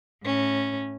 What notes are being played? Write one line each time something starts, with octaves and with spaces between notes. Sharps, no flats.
A2 C#4